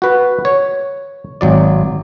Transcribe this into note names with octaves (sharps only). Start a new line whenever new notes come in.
F#4 B4
C#5
G#1 F#3 D5